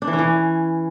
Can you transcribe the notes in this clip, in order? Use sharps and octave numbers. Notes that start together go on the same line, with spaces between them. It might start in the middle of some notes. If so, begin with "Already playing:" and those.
D4
E3
C#4
E3